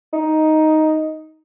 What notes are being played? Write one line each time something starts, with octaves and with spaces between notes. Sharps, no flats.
D#4